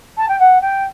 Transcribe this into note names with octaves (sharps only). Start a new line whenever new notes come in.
A5
G5
F#5
G5